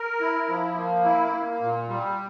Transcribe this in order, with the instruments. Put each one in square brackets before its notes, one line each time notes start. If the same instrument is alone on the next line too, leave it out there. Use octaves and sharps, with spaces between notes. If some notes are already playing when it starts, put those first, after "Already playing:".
Already playing: [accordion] A#4
E4
F3
A#3
E4
A#3
A#2
G3